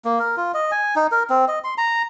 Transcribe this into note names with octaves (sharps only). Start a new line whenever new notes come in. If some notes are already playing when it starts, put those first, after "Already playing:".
A#3
A#4
F4
D#5
G#5
D#4
A#4
C4
D#5
C6
A#5